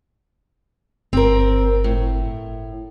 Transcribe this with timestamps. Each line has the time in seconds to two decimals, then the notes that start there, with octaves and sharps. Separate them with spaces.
1.13 G1 C4 A#4
1.84 A2